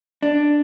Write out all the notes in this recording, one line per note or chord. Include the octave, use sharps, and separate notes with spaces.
D4